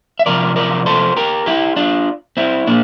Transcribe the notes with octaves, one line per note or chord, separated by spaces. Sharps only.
E5
C3 F3 A#4 D5
A#4 D5
A4 C5
G4 A#4
E4 G4
D4 F4
C4 E4
A#2 A#3 D4